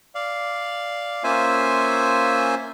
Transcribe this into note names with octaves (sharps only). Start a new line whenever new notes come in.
D5 F5
A#3 C#4 F4 C5 E5 G#5